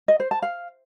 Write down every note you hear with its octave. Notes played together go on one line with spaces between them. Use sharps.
D#5
C5
A5
F5